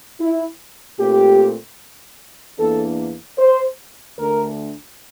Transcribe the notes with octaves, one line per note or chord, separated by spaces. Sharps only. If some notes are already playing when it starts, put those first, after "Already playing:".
E4
A#2 A3 C4 G4
E2 E3 A#3 D4 A4
C5
D2 D3 A3 D4 A#4